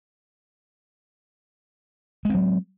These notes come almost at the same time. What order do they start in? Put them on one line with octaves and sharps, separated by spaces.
G#3 C4 F#3